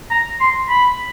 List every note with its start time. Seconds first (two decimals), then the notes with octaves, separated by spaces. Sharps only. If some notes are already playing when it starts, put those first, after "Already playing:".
0.11 A#5
0.40 C6
0.69 B5